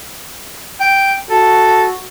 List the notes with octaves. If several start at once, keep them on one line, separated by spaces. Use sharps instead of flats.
G5
F#4 A4